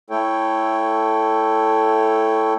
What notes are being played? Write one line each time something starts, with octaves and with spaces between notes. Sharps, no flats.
A3 E4 A4 C#5 G5